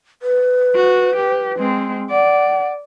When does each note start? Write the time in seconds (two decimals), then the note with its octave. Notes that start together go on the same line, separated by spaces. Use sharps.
0.22 B4
0.75 F#4
1.16 G4
1.57 G#3 C4
2.10 D5 F#5